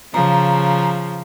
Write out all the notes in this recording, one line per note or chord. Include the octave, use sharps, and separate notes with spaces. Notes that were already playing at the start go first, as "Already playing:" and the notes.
C#3 F3 A#5